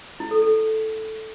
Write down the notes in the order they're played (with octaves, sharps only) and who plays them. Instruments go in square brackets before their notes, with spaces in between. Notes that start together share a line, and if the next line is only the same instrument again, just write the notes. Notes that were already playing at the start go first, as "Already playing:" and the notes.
[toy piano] E4
A4
A4